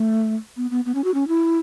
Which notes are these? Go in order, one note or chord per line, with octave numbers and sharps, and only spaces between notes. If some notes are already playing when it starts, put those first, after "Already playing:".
Already playing: A3
B3
B3
B3
C#4
F#4
C#4
E4